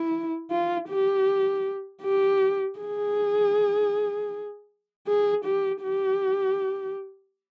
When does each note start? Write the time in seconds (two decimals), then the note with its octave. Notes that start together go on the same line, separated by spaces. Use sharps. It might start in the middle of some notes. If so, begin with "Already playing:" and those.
Already playing: E4
0.51 F4
0.89 G4
2.02 G4
2.79 G#4
5.08 G#4
5.45 G4
5.83 G4